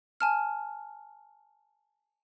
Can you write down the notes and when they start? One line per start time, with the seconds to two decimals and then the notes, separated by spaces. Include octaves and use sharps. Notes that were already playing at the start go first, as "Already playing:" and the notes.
0.21 G#5 A5 F6